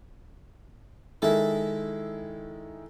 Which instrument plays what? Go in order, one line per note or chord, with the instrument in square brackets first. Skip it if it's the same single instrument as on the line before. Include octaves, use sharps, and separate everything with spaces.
[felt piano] D#3 G#3 E4 [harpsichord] A4 E5